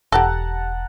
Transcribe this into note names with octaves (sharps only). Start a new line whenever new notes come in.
E1 G4 A4 F#5 A5 A#5